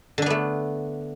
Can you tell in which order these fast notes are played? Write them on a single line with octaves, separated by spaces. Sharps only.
D3 D4 B3 A3